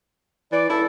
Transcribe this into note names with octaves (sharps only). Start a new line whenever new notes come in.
E3 D5
C#2 E4 A4